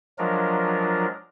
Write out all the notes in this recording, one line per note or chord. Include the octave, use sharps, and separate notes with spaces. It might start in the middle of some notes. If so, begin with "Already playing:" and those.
F3 F#3 G#3 D4 F4 A#4